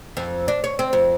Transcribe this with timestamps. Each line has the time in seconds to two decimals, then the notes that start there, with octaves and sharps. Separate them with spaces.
0.17 F2
0.48 D4
0.64 C#5
0.79 C4
0.93 F2